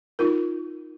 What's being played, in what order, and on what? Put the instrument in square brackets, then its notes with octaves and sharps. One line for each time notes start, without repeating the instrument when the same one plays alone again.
[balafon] D#4 F4 A#4